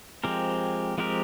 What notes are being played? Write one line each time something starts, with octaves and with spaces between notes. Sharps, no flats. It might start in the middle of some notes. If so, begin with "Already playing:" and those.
F3 G#3 C4 G4 A#4
F3 G#3 C4 G4 A#4